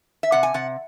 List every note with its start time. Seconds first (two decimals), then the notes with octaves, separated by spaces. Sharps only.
0.23 E5
0.32 C3 F#5
0.43 G#5
0.54 C3 F#5